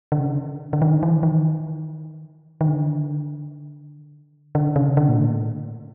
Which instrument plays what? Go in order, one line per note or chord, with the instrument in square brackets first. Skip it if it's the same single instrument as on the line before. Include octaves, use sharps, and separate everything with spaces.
[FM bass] D3
C#3
D3
D#3
E3
D#3
D#3
D3
D3
C#3
D3
A#2
A2